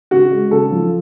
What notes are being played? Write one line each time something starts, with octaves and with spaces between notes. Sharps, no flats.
C#3 F#4
G#3
C#3 A4
F3